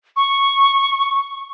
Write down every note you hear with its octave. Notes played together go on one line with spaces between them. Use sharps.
C#6